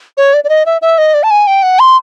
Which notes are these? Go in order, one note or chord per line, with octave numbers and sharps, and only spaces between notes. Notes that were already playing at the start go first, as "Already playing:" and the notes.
C#5
D5
D5
D#5
E5
E5
D#5
D5
A5
G#5
G5
F#5
C6